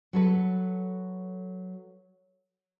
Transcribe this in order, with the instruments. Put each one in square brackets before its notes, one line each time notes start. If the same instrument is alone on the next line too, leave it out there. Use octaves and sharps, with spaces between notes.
[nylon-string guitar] F#3 A4 B4